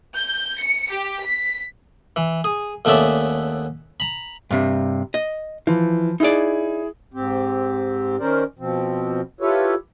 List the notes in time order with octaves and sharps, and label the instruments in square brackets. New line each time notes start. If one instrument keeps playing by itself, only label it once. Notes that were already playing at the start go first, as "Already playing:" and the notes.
[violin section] G6
C#7
G4
B6
[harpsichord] E3
G#4
D#2 A3 B3 C#4 D5 E5
A#5 B5
[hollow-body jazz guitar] G2 C3
D#5
[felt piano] E3 [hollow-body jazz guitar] F3
[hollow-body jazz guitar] D#4 D5 [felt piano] E4 G#4
[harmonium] G#2 C4 G4
D#3 C#4 A#4 C5 D5
B2 F3 C4
E4 F4 G4 A4 B4 C#5